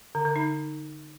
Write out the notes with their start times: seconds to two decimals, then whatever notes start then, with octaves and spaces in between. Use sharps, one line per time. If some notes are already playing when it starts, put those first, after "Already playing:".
0.15 D3
0.25 D3
0.36 D#4